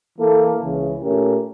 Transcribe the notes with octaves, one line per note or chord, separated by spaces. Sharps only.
E3 A#3 E4 A4
C#2 C#3 E3
A#2 A3 C#4 G4 A#4